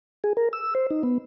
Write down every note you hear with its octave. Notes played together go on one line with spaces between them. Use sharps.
G#4
A#4
E6
C5
D#4
B3